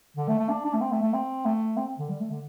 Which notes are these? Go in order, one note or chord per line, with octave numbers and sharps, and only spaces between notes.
D3
A3
A3
D4
D4
A3
C4
A3
A3
C4
A3
C4
D3
G3
A3
D3